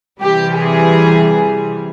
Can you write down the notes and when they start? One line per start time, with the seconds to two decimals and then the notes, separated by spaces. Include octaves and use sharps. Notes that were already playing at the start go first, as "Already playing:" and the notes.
0.20 C3 E3 G3 G4
0.59 G#4